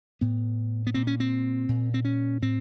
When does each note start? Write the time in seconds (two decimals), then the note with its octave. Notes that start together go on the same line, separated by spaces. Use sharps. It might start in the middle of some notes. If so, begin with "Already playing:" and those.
0.21 A2 B3
0.87 B3
0.94 A#2 C4
1.07 C#4
1.20 C4
1.69 A#2
1.94 C4
2.05 C#4
2.42 A2 C4